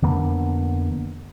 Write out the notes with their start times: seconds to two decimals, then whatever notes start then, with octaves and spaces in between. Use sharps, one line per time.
0.02 F2 D3 A#3 B3